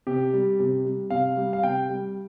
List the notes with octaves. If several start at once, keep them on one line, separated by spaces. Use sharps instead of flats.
C3 G4
G3
C3
G3
C3 F5
G3
F5
C3 G5
G3